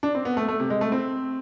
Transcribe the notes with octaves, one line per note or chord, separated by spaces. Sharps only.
D4
C4
B3
A3
A3
C3
G#3
A3
C4